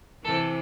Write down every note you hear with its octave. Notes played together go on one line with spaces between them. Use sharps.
C3 E3 A4